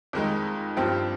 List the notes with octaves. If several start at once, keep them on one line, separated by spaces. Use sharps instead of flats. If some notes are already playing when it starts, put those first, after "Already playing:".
F2 D#3 G#3
G2 F3 C4 G4